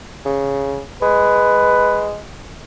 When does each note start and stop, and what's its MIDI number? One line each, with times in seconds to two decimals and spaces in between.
0.25 0.81 49
1.02 2.18 56
1.02 2.11 71